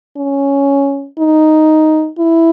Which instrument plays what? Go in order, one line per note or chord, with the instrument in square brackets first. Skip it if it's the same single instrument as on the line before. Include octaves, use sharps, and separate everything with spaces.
[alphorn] C#4
D#4
E4